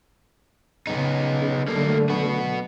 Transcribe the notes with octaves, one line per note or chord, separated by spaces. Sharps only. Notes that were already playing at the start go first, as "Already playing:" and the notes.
C#3 B3 D#4
D3 F#3 G3 A3 A#3
B3 F#4